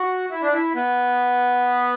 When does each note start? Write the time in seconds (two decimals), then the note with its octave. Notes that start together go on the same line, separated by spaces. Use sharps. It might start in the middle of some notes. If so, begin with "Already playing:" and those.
Already playing: F#4
0.31 E4
0.42 D4
0.53 E4
0.75 B3